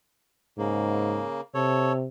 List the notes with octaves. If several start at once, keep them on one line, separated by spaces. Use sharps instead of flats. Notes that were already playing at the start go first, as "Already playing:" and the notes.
G#2 C#3 A#3
C3 A4 C#5